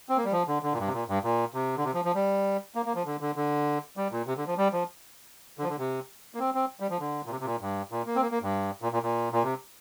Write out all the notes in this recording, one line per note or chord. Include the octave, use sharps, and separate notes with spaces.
C4
A#3
G3
F3
D3
D3
A#2
G2
C3
A#2
G2
A#2
C3
D3
C3
F3
F3
G3
A#3
A#3
F3
D3
D3
D3
G3
A#2
C3
D3
F3
G3
F3
D3
F3
D3
C3
A#3
C4
C4
G3
F3
D3
A#2
C3
C3
A#2
G2
A#2
A#3
C4
A#3
A#3
G2
A#2
A#2
A#2
A#2
C3